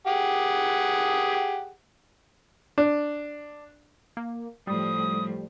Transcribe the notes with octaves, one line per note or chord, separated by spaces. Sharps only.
G4 G#4 F#5
D4
A#3
A2 F3 G3 D#6